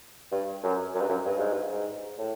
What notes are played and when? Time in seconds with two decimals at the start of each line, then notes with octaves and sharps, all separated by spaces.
0.32 G2
0.64 F#2
0.95 F#2
1.01 G2
1.09 F#2
1.25 G2
1.38 G#2
1.53 G2
1.72 G#2
2.18 A2